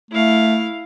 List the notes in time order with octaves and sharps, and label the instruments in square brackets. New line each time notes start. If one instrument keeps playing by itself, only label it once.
[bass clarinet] A3 [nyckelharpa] E4 F5